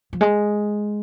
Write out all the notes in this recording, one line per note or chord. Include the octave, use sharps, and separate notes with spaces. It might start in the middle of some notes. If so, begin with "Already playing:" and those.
F3
G#3